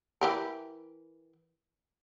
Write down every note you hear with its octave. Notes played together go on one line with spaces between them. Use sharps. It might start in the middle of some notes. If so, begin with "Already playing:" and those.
E3 G4 A#4